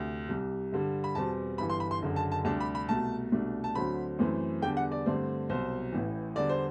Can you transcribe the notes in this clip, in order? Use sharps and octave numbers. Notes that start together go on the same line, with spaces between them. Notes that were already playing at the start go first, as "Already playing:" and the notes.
Already playing: D2 C3
C2 C3 G3
G2 D3 G3
B5
E2 B2 G3 C4 A5
G1 G2 E3 B5
C6
B5
C6
F#1 F#2 D3
A5
A5
D2 C3 G3 D4 A5
B5
B5
C2 B2 A3 A5
C2 B2 A3 D4
A5
D2 D3 F#3 C4 B5
F#2 E3 A3 C4
E2 D3 G3 D4 G5
F#5
D5
G2 D3 A3 C4
C2 B2 F#3 C4 C5
A1 A2 E3
E2 D3 G3 B3 D5
C5